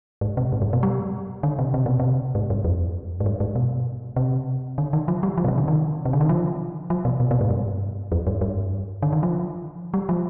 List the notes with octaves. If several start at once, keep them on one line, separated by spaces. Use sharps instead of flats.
G#2
C3
G#2
G2
B2
G3
D3
C3
C3
B2
C3
G#2
G2
F2
G#2
G2
G#2
B2
C3
D3
D#3
F3
G3
F3
B2
C3
D3
D#3
C3
D3
D#3
F3
F3
B2
B2
B2
G#2
G2
F2
G2
G2
D3
D#3
F3
G3
F3